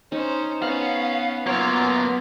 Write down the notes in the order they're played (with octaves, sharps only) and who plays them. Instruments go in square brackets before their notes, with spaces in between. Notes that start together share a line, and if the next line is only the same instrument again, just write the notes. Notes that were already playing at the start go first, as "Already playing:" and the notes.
[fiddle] C#4 C5 [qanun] D#4
[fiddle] B3 C#4 [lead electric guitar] F5 [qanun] F#5
[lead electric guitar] F#3 A#3 [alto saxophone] B3 [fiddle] F4 [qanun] C#5